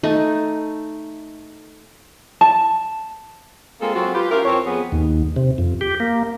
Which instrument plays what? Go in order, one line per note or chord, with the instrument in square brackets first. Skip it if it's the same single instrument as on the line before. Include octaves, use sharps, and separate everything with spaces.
[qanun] A3 D#4
[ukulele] A5
[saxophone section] G#3 A#3 C4 F4 G#4 A4
F#3 G#3 C4 F4 F#4
F4 G4 B4
C#4 E4 F4 G4 A#4
F2 F3 C4 C#5
F2 B3 G#4
[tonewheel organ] D#2
C3
F2
G4
A#3